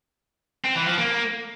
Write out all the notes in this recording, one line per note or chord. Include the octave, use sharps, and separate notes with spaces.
C4
E3
F3
A#3